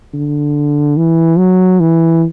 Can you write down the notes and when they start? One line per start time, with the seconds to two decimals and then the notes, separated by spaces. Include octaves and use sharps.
0.14 D3
0.97 E3
1.38 F#3
1.80 E3